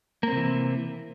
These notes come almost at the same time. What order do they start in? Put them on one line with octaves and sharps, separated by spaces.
A#3 C4 C3 E3